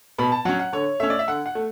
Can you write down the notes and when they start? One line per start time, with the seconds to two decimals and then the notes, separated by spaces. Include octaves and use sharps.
0.18 B2 B5
0.32 A5
0.45 F#3 C#4 F#5
0.59 F#5
0.72 D3 C#5
1.00 A3 C#4 E5
1.10 D5
1.19 E5
1.27 D3 F#5
1.46 F#5
1.55 A3